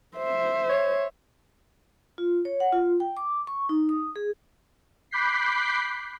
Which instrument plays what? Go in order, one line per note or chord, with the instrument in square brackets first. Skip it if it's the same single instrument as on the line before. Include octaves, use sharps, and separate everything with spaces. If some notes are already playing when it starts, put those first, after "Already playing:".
[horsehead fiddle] C5 E5
[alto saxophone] C#5
[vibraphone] F4
C#5
F#5
F4
G5
D6
C#6
D#4
D#6
G#4
[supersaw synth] B5 D6 F#6 G6 B6 C7